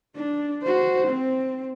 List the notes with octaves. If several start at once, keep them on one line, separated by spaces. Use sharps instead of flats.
D4
F#4 C5
C4